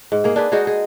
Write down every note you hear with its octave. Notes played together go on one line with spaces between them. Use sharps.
G#2
A#3 G#4
D4 G#4 B4
G#3 D#4 F#4 G#4
G#4